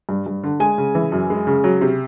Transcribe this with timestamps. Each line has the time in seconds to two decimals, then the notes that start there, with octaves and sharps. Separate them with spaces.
0.09 G2
0.26 G2
0.44 D3
0.60 G#3 G#5
0.78 C#3
0.95 E3
1.12 F#2
1.30 G#3
1.47 C#3
1.64 F#3
1.81 C3